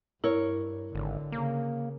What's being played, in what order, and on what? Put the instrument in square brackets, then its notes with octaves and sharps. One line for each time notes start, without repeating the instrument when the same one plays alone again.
[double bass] G2 [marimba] E4 [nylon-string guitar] A#4 C#5
[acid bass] G#1 [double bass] D3
[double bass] C#3 [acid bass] A#3